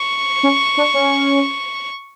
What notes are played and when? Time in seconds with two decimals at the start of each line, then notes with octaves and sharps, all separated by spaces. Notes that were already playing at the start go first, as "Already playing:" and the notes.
Already playing: C#6
0.43 C#4
0.77 D4
0.94 C#4